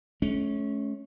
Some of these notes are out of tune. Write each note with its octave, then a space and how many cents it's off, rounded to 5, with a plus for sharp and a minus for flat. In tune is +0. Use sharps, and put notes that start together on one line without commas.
A3 -40 C#4 +0